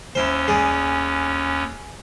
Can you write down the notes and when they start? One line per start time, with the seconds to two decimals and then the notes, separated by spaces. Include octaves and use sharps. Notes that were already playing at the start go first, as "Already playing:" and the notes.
0.15 D#2 C#4 E4 C5
0.48 G#4 D5